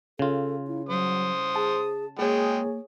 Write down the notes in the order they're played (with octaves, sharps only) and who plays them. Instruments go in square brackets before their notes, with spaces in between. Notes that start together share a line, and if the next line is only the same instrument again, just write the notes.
[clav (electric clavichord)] C#3 F4 [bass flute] A4
[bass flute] E4
[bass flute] F#3 [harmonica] C5 D#6
[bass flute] G#4 [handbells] A5
[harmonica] G#3 G5 [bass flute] A#3 [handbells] G#4 C#5